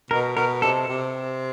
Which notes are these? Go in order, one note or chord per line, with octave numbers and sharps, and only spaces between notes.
B2 A#4
B2 A#4
C3 A4
C3